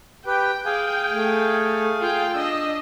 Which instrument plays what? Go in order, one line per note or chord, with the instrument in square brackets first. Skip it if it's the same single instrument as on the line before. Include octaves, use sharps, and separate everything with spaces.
[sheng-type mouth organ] G4 B4 [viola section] G5
[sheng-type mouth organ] G#4 F5 G#5
[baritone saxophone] A3
[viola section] F4 G5
[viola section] D4 D#5 [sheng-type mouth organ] E6